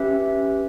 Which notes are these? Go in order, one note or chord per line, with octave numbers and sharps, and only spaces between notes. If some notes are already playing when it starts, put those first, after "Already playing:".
Already playing: C#4 G4 B4 E5